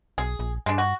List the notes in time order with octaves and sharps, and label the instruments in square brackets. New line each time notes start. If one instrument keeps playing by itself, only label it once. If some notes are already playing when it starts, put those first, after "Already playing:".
[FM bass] B1 [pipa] G#4
[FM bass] A#1
[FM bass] G2 [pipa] G#3 D4
[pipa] F#4